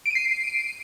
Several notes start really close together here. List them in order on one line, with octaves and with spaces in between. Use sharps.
D7 D#7 C7